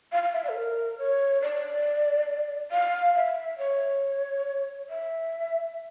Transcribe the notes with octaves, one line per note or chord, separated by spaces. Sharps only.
F5
F5
E5
D5
A4
A#4
C#5
D5
F5
E5
C#5
E5